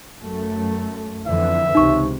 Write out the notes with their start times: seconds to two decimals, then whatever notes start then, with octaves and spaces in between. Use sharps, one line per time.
0.21 F#2 A3
1.26 F2 D3 E3 E5
1.75 C#2 C3 D#4 C#6